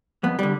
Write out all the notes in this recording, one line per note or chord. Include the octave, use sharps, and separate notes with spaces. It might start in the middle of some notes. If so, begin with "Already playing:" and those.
F2 B3
D3 G3